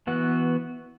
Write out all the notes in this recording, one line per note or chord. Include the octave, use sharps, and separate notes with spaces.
E3 B3 F#4